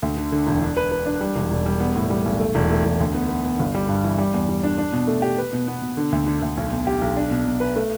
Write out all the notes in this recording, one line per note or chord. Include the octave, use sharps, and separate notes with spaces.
D2
D3
D3
E1
D4
B4
B4
D4
G3
E1
E1
G3
B3
A2
G3
B1
A3
E1
A3
E1
D2
B3
B3
B3
G1
G3
G2
E3
G3
E2
G3
D4
D4
B2
A3
G4
B4
B2
B3
B2
D3
D2
D3
D2
B1
B2
G4
B1
D4
B2
B2
B4
A3